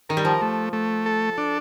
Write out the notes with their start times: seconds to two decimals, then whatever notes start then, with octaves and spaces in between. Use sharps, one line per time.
0.09 D#3 A#4
0.17 G3
0.25 F3
0.42 A3
0.73 A3
1.06 A4
1.38 D4